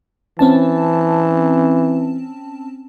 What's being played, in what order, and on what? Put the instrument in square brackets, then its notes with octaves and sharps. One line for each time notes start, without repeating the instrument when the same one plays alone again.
[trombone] E3 [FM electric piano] C4 C#4 A5